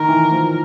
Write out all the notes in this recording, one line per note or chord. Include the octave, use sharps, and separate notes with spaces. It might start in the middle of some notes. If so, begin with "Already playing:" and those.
Already playing: D#3 A#4
E3
F3